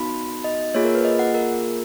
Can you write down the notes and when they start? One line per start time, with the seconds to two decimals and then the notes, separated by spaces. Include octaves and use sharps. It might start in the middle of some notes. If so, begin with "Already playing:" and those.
Already playing: B3 D#4 F#4 B5
0.44 D#5
0.74 A#3 F4 G#4 C#5
0.85 A#4
0.95 B4
1.05 D#5
1.19 F#5
1.34 A#4